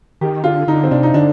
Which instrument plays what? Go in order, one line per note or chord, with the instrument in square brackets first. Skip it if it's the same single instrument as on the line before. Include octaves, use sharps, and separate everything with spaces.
[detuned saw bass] D#3 [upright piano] G4
[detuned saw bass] D3 [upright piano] F4
[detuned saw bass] D3 [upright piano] D#4
[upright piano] C4
[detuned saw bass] C3 [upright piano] D4
[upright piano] D#4
[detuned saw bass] D3 [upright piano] D4